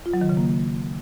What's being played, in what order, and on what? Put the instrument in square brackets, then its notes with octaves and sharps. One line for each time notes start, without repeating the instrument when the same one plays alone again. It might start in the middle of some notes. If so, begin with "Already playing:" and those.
[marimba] F4
F#3
D#3
C#3
A#3